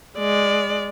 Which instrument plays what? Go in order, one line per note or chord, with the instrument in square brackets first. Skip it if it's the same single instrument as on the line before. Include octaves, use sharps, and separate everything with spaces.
[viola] G#3 D5